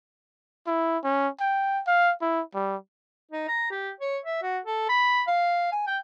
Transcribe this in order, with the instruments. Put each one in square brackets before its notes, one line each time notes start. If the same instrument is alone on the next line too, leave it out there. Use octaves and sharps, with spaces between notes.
[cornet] E4
C#4
G5
F5
E4
G3
[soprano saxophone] D#4
A#5
G4
C#5
E5
F#4
A4
B5
F5
G#5
G5